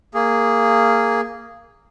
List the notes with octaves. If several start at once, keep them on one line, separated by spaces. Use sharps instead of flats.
A#3 G#4